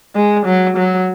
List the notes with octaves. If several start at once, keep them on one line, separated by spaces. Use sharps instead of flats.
G#3
F#3
F#3